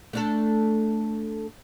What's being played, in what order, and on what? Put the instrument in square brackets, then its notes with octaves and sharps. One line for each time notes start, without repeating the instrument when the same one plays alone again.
[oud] A3 D4 A4